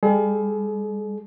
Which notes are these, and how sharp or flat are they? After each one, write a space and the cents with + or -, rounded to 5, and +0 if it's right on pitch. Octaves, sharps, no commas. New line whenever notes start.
G3 +45 G#4 +45